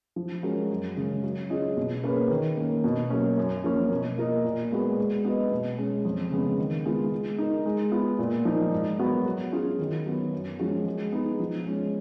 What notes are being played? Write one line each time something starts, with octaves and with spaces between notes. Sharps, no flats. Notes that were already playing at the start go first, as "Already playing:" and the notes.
F3
G#3 C#4 F#4 A#4
F#2
C#3 G#3 C#4 G#4
F#3
C#4 F4 G#4 D#5
B2
A#3 C#4 G#4 B4
D#3
A#3 C#4
B2
F#3 A#3 C#4
F#2
F3 A#3 C#4
B2
A#3 F4 A#4 D#5
A#2
G#3 B3 F#4 B4
G#3
B3 F#4 B4 D#5
B2
G#3 C#4
F2
C#3 G#3 B3
D#3
G#3 B3 F4
G#3
D#4 A#4
G#3
B3 F4
A#2
F3 A#3 D#4
G#2
F#3 B3 F#4 A#4
F#3
C#4 F4 G#4
D#3
F#3 B3
F#2
F3 G#3 C#4 F#4
G#3
B3 D#4 G#4
F3
G#3 C#4